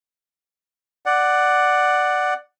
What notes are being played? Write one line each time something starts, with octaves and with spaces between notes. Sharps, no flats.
D5 F#5